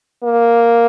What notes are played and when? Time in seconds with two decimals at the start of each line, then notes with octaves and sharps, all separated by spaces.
0.24 A#3